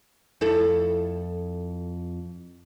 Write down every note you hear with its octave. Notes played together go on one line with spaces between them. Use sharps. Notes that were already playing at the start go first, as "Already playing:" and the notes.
F2 E4 A4